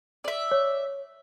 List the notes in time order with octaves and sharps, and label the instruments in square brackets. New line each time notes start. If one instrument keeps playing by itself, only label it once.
[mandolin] D5 E5
[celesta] C#5